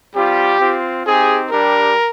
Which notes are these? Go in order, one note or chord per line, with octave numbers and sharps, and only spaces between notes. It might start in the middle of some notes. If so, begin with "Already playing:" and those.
G3 C4 F4 G4
C4 F4
C4 D#4 G4 G#4
G3 D4 G4 A#4